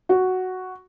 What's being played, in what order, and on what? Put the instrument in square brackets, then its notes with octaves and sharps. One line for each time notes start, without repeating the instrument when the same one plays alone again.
[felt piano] F#4